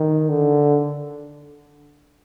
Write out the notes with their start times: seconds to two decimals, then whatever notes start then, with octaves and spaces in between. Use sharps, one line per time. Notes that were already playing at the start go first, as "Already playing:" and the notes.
Already playing: D#3
0.29 D3